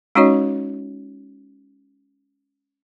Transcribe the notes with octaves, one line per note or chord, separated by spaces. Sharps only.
G#3 C#4 D#4 F#4 C#5 D#5